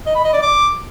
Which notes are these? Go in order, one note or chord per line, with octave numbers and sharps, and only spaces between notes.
D#5
B5
D#5
D5
D6